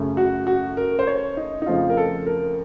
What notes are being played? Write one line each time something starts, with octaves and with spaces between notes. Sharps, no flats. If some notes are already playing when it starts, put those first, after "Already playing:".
Already playing: F#2 C#3 A3
F#4
F#4
A#4
C5
C#5
D#4
D#4
F2 C#3 F3 A3 F4
A#4
A4
A#4